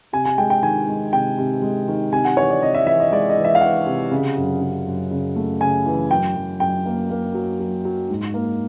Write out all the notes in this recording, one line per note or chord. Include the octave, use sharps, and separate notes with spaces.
C3 G#5
G#5
G#3 G5
G5
D#3 G#5
G#3
C3 G5
C3
G#3
D#3
C3 G#5
F#5
E3 C#5
D5
C3 D#5
E5
E3 E5
D#5
G#3 D5
D#5
E3
E5
F5
E3 F#5
C3
C#3
F#2
C#3
F#2
C#3
A3
C#3 G#5
E3
F#2 G5
F#2
F#2 G5
A#3
A#3
F#3
F#3
F#3
G#2
A#3